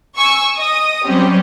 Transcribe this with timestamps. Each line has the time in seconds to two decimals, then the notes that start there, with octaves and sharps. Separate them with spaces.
0.16 G#5 C#6 E6
0.56 D#5 D#6
1.06 F#3 G3 C4 C#4 G4